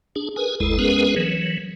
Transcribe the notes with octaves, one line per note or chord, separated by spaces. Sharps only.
D4 G#4
G#4 A#4 B4 G#5
G1 D#2 G#3 E4 A4
G#3 B3 C#4 G#4 A#4 B4
E3 F#3